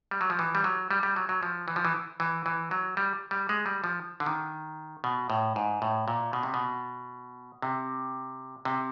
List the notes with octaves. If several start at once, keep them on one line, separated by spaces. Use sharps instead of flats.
G3
F#3
F3
E3
G3
F#3
G3
G3
F#3
F#3
F3
E3
F3
E3
E3
E3
F#3
G3
G3
G#3
G3
F3
D3
D#3
B2
A2
G#2
A2
A#2
B2
C3
B2
C3
C3